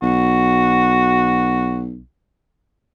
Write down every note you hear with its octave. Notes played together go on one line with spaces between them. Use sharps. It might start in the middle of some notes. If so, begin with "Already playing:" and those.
B1 F#4